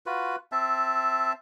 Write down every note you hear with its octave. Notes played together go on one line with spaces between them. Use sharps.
F4 F#4 B4
C4 E5 A5